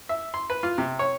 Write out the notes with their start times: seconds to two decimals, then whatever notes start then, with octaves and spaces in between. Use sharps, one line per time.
0.09 E5
0.34 C6
0.50 B4
0.63 F4
0.78 C3
0.99 C#5